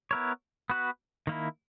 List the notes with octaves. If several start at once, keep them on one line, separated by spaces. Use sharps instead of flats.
B3 E4 A#4 C#5
B3 F#4 B4
D#3 A#3 E4